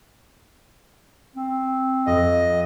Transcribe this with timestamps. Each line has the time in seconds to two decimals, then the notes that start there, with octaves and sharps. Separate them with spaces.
1.36 C4
2.06 F2 D#5